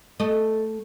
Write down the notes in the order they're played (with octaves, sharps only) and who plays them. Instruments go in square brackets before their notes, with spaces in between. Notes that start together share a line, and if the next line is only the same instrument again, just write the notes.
[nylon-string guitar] A3 [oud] A4 D#5